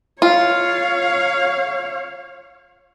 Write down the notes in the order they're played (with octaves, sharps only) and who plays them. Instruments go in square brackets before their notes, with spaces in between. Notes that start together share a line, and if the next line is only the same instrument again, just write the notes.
[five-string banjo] F4 [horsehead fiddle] C#5 F5